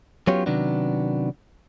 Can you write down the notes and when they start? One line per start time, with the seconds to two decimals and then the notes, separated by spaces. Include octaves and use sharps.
0.27 F#3 B3 C#4 F4 G4 C#5
0.46 C3 D#3 F#3 B3 D4